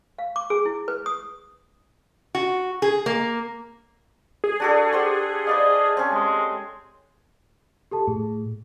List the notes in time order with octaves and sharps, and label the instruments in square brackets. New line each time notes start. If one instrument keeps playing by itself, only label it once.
[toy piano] F5
D6
G#4
E4
B4
D#6
[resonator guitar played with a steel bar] F#4
G#4
A#3
[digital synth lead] G#4
[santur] D4 F#4 A4
G4 C5 F#5
[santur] B4 D5 F5 [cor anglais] D#5
[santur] C4 C#4
[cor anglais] G#3
[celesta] G4 A4 A5
[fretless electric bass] A2 [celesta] G#4